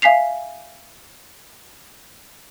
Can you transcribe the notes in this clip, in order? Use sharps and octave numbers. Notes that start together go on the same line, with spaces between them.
E5 F5 G#5 B6 C7 F7